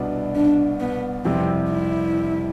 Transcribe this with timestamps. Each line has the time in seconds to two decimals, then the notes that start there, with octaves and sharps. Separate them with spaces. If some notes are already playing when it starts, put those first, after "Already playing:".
Already playing: C2 B2 B3 D4
0.35 D4
0.81 B3
1.25 F2 C3 E3 G3 C4
1.70 E4